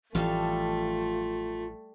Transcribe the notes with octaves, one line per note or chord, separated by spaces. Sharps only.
A1 E3 F3 G3 A3 F4 A4 F5